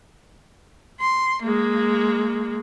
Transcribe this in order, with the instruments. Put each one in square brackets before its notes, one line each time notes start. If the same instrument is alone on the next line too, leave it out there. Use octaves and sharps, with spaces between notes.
[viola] C6
G#3 A#3